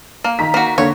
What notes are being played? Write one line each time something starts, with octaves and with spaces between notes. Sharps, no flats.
A#3
D#3 A#5 B6
A#3 F#4
D3 A#3 C#5 C#6